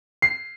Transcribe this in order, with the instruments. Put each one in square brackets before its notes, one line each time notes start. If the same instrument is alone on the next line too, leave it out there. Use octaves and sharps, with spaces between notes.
[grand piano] C7